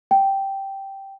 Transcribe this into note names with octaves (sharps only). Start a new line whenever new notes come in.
G5